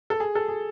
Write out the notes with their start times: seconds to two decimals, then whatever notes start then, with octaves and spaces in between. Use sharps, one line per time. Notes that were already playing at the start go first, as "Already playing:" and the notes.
0.10 A4
0.20 G#4
0.35 A4
0.48 G#4